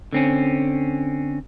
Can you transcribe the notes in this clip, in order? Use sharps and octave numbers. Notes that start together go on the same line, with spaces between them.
D3 C4 C#4